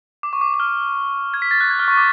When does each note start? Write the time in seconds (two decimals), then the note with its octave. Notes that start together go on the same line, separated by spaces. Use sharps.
0.23 D6
0.33 C#6
0.41 D6
0.54 D6
0.60 F6
1.34 G#6
1.42 B6
1.51 A6
1.61 F#6
1.70 G#6
1.79 F6
1.88 C#6
1.97 D6